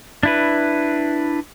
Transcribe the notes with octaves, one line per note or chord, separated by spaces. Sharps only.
D4 E4 B4